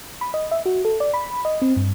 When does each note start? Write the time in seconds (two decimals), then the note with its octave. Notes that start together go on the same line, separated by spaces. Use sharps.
0.21 B5
0.34 D#5
0.51 E5
0.66 F#4
0.85 A4
1.00 D5
1.14 B5
1.45 D#5
1.62 C4
1.77 G2